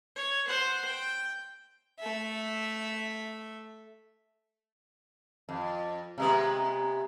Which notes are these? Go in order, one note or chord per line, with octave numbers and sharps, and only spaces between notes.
C#5
C5 F#5
G5
A3 E5
F2
C3 G#3 B3